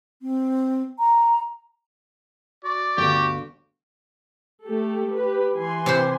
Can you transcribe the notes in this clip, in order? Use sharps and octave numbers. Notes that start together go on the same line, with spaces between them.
C4
A#5
F#4 D5
G1 D2 F#4 G4
A3 G4 A4
G4 B4
E3 G#5 C6
C3 B4 C5